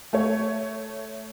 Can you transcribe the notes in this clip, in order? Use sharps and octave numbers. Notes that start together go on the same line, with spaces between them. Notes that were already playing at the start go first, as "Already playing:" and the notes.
A3 C#5